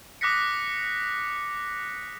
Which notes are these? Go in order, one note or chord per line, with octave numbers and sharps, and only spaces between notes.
D6 D#6 F#6 A#6 B6 C#7